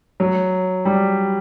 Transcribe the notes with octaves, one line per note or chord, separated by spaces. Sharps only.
F#3
G3